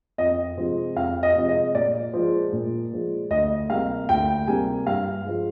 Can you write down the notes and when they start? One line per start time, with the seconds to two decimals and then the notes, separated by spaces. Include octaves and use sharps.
0.18 F2 D#5
0.57 C3 F3 G#3
0.96 F2 F5
1.23 D#5
1.36 C3 F3 G#3
1.49 D#5
1.74 A#2 D5
2.13 F3 G#3
2.52 A#2
2.92 F3 G#3
3.30 D2 D#5
3.69 C3 G3 A#3 F5
4.09 D2 G5
4.47 C3 G3 A#3 G#5
4.87 G2 F5
5.25 F3 G#3